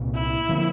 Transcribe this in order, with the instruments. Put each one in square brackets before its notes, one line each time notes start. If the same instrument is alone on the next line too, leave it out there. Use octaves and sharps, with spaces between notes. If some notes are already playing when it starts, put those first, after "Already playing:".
Already playing: [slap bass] C2 A#2 G3
[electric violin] E4
[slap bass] D3 F3 A#3